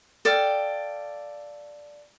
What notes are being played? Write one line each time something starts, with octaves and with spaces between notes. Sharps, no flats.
A4 D5 F5 G5